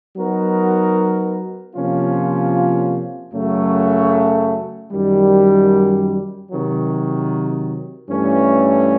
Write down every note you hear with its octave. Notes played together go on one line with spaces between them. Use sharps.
F#3 B3 D#4 F#4 A#4
C3 F3 A#3 C#4 F4
F#2 C#3 F#3 A3
F#2 D#3 G3
C3 D#3 F#3
G2 E3 A3 C#4